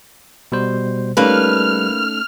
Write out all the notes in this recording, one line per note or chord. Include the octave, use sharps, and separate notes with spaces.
B2 G3 C5
G3 A3 A#3 C#4 D#4 A4 B4 F6